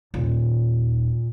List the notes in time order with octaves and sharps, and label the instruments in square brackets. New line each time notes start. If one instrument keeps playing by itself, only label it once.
[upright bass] D#1 [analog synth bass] A#2